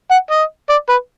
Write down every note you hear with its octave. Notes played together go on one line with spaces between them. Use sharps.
F#5
D#5
D5
B4